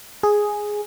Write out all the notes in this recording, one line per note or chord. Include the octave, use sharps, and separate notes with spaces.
G#4